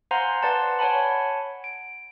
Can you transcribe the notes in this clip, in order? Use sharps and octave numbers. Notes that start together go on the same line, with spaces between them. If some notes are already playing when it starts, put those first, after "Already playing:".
C5 F5 F#5 G#5 A#5 C6
B4 D5 F#5 A5 C6
C#5 F#5 G#5 A5 B5
D7